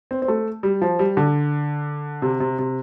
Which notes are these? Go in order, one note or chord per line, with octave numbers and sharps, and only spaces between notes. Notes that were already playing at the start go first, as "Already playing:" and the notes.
C4
C4
A3
G3
F3
G3
D3
C3
C3
C3